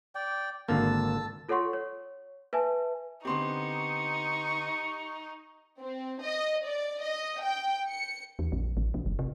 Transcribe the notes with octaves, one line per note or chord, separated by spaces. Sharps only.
D5 G5
G#1 D3 A#3 A5 E6
F4 A4 C#5 F#5 C6 C#6
C#5
B4 E5 G#5 A5
D3 B3 C4 D#4 G4 C6 C#6
C4
D#5
D5
D#5
G5
C#7
E2
A#1
A1
B1
F#1
C3